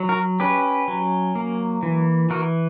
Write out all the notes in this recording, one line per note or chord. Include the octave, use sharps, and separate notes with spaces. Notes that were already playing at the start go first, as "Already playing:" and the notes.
Already playing: F#3
F#4 A#4
C#4 G4 B4
F#3
A#3
E3
E3 F#4 A#4